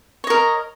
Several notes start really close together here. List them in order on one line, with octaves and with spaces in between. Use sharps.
C#5 D#5 A#4